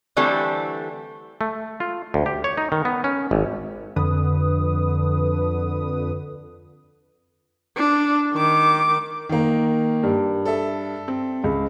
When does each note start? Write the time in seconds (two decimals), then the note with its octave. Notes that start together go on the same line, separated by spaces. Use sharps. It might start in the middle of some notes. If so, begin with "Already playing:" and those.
0.17 D3 E3 G3 A3 C4 A4
1.41 A3
1.80 F4
2.14 D2
2.26 G4
2.44 C#5
2.57 D#4
2.72 D#3
2.85 B3
3.04 C#4
3.31 G#1
3.96 F2 D3 B4 D#6
7.76 D4
8.34 D#3 D6
9.29 D#3 A#3
10.03 G2
10.46 A4 E5
11.08 C4
11.44 C#2